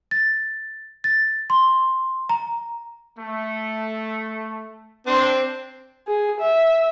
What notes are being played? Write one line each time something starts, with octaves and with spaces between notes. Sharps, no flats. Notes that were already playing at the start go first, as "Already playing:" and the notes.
A6
A6
C6
A#5
A3
C4 D4 C6
G#4
E5